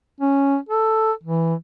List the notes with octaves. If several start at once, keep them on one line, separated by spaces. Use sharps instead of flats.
C#4
A4
E3